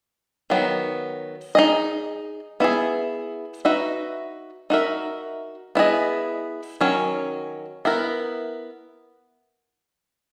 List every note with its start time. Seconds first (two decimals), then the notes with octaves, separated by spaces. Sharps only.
0.50 D#3 F#3 B3
1.55 D#4 G#4 D#5
2.60 B3 E4 G#4
3.65 D#4 F#4 B4 E5
4.70 D#4 F#4 A#4 E5
5.75 B3 E4 G#4 D#5
6.81 D#3 F#3 C#4
7.85 B3 E4 A#4